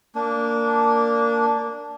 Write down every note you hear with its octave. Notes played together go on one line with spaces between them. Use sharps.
A#3 D4